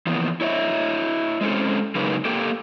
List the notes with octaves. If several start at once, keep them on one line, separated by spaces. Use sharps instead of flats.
E3 F3 A#3 B3
E4 C#5 D#5 E5
G#3 C4 C#4 A4
C#3 F#3 G#3 A#3 D#4 B4
A#3 G4 A4 G5